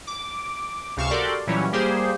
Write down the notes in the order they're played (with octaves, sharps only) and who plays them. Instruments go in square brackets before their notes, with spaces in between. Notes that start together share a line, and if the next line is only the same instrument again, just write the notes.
[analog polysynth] D6
C#2 C3 F5 C#6 E7
F#4 G4 A4 A#4 D5 C6
A#2 E3 F#3 G3 C#4 E4
G3 A#3 G4 G#4 C5